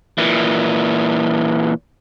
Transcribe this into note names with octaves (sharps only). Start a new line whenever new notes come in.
A#2 E3